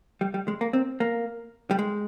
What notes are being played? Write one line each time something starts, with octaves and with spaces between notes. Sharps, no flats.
G3
G3
G#3
A#3
C4
A#3
G3
G#3